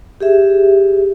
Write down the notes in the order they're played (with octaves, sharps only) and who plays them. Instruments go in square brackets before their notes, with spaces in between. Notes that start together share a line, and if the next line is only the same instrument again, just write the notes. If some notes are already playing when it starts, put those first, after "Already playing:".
[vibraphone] G4 G#4 E5